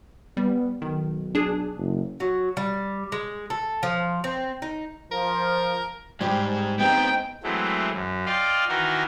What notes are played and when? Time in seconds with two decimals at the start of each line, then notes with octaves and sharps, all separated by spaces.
0.37 G3 B3
0.82 B1 D#3
1.35 D4 G#4
1.77 F#1
2.20 F#3
2.57 G3
3.12 G#3
3.50 A4
3.83 F3
4.24 C4
4.62 D#4
5.12 F3 A#4
6.21 G#2 G3 G#3 C4 G4
6.80 G#3 B3 C4 D#4 G5
7.43 E3 F#3 G#3 A3 C4
7.93 F#2
8.26 F4 D5 D#5 F5 G5
8.68 D#3 E3 D#4 F#4 A#4